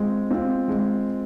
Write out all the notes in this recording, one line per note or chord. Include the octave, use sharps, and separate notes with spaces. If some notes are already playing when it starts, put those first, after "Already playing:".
Already playing: G#3 C4 F4
C4 F4
G#3